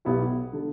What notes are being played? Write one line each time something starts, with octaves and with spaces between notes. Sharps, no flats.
B1 B2 B3 E4 G4
D3